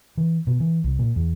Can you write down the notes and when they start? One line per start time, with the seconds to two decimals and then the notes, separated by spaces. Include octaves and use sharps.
0.17 E3
0.47 B2
0.60 E3
0.84 C2
0.99 A#2
1.16 E2